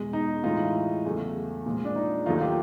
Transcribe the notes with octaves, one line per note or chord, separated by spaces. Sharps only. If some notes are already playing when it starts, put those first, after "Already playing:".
Already playing: E2 B2 G#3
D#4
A2 E3 G#3 D#4 F4
E2 C#3 F#3 A3
A#2 F3 G#3
D4
D#4
D#2 D#3 F#3 A3 D#4 F4
F4 G4